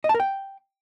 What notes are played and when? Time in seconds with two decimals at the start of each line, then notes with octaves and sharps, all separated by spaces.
0.04 D#5
0.09 A5
0.14 A#4
0.20 G5